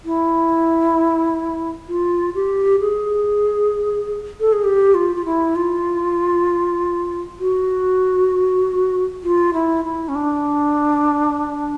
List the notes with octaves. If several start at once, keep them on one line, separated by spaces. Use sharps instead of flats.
E4
F4
G4
G#4
A4
G#4
G4
F4
F4
E4
F4
F#4
F4
E4
E4
C#4
D4